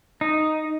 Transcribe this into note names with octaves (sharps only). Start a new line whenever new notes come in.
D#4